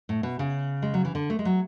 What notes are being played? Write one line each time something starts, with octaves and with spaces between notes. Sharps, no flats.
A2
B2
C#3
G#3
F#3
E3
D3
A3
G#3
F#3